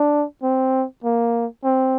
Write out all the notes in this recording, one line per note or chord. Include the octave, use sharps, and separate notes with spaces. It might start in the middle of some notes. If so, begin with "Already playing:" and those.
Already playing: D4
C4
A#3
C4